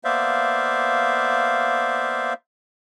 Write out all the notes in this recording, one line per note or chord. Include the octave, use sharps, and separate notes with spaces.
A#3 B3 C5 D5 E5 F5